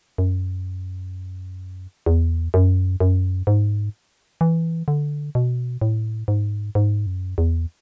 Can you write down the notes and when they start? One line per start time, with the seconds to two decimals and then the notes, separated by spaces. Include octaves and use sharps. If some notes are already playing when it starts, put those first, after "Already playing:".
0.18 F#2
2.06 E2
2.54 F#2
3.00 F#2
3.47 G#2
4.41 E3
4.88 D3
5.35 B2
5.81 A2
6.28 G#2
6.75 G#2
7.06 F#2
7.38 E2